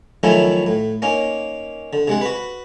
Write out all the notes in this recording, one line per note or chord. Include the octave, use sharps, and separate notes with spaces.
D#3 F3 F#3 A3 C#4 E4
A2
A#3 C#4 D#4
D3
C3 G#3 F#5
F#4 B4